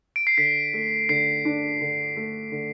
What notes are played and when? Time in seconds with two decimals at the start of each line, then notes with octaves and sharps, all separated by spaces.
0.16 D7
0.27 C7
0.37 D3 B6
0.73 A3
1.09 D3 C7
1.45 D4
1.81 D3
2.16 A3
2.52 D3